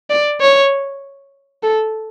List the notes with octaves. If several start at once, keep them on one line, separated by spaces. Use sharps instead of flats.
D5
C#5
A4